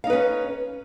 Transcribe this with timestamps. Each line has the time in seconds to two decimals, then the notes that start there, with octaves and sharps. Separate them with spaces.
0.04 F5
0.07 D#4
0.10 B4
0.13 C#4